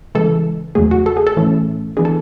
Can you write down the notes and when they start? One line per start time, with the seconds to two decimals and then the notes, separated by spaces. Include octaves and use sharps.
0.15 C#3 E3 G#3 A4
0.75 E2 C#3 F#3 A3 G#4
0.91 F#4
1.06 A4
1.17 G#4
1.27 A4
1.37 A2 E3 A3 C#4
1.97 E3 B3 D4 G#4
2.05 A4